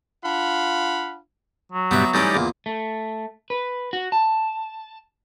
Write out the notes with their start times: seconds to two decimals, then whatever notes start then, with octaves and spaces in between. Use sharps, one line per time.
0.24 D4 F4 F5 F#5 B5
1.72 F#3
1.91 G2 B2 G3 B3 E5
2.14 E3 G3 A3 C#4 D#4 D5
2.34 E2 A#2
2.66 A3
3.50 B4
3.93 F#4
4.12 A5